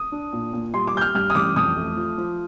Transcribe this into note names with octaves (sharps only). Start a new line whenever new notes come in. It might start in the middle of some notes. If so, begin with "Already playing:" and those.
Already playing: D#6
D4
A#2
A#2
G3 C6
D6
G3 G6
F6
G2 F6
D#6
A1 D6
F2 D#6
A3
F3
F3